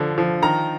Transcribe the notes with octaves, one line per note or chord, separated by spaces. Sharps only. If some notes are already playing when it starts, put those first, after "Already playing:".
Already playing: D3 F3
F3
D#3 A#5